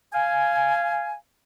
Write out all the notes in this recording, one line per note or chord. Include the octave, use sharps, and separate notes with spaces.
F5 G#5